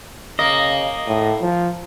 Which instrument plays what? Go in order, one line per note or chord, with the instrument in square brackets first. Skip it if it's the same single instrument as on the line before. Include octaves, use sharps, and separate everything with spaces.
[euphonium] C#3 [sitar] A#3 [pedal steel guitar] D#5
[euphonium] A2
F3